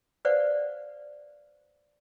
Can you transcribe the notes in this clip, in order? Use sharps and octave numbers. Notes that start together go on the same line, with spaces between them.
B4 C5 D5 F5 F#5